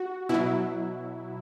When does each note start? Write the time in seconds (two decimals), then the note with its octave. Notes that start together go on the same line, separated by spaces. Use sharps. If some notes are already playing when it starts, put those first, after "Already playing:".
Already playing: F#4
0.29 B2 F#3 E4